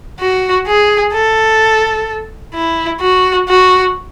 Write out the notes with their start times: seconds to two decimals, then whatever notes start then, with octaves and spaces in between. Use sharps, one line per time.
0.20 F#4
0.67 G#4
1.13 A4
2.55 E4
3.01 F#4
3.49 F#4